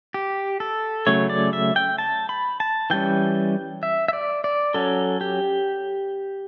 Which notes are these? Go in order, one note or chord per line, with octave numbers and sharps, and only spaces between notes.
G4
A4
C#3 F#3 A3 C#5
D5
E5
G5
A5
B5
A5
E3 G3 C#4 G5
E5
E5
D5
D5
F#3 C#4 A4
G4